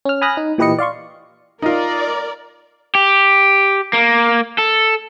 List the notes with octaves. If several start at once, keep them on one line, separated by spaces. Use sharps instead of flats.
C#4 F6
G#5 B5 D#6 F6 F#6 A#6
D#4
A#2 E3 G4 B4 D#5 C#7
D5 F5 C6 C#6
D#4 F4 A#4 D5
G4
A#3
A4